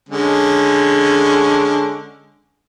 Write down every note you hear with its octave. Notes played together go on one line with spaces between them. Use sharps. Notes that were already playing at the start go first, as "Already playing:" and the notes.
D3 G#3 C#4